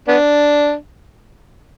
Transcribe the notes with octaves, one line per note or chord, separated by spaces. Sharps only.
B3 D4